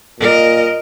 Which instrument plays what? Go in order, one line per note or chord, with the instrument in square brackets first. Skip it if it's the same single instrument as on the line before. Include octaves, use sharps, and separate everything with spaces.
[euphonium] A#2 [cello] A#4 D#5